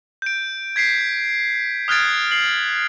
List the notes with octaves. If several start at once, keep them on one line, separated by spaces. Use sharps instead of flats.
G6 D7
G#6 B6 C7 D7
D#6 F6 F#6 G#6 A6 D7
C7 F#7